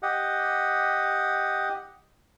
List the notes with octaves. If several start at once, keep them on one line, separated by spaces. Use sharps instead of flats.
G4 D#5 F#5